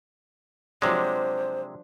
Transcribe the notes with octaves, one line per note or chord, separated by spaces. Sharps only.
C3 F3 F#3 G#3 D4 C5